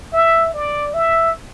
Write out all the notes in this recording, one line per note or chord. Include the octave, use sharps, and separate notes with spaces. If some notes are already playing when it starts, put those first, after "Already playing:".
E5
D5
E5